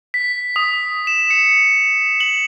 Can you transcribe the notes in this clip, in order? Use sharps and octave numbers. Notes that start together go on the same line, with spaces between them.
B6
D#6
E7
C#7
F#7